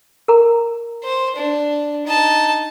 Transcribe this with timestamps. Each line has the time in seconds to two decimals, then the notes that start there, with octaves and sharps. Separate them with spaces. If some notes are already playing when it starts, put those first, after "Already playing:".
0.28 A#4 A#5
1.04 C5
1.36 D4
2.06 D#4 A5